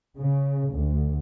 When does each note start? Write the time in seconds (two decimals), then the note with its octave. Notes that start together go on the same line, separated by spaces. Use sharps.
0.18 C#3
0.73 D2